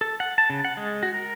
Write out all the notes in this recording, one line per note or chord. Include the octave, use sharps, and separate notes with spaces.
A4
F#5
A5
C#3
F#5
G#3
F#4
A#4